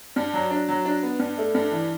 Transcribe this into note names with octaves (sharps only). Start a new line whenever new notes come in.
G2
F#3
D4
F#3
D4
B3
G2
A3
G2
E3